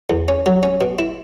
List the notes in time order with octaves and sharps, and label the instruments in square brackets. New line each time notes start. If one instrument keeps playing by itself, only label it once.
[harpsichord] E2
C#4
F#3
C#4
B2
E4